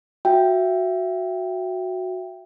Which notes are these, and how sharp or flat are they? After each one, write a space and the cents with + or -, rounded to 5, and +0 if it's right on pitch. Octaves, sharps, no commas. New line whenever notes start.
F#4 -5 E5 +25 G5 +0